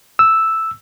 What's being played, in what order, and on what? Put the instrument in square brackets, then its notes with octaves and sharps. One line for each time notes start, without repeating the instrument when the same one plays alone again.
[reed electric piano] E6